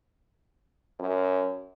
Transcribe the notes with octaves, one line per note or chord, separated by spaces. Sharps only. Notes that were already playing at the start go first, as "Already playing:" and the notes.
F#2